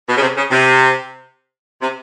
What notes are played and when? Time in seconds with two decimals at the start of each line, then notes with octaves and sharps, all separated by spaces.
0.08 B2
0.17 C#3
0.22 C3
0.37 C#3
0.51 C3
1.82 C3